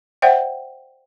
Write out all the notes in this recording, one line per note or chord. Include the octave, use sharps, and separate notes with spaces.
C5 D5 E5 F#5 G5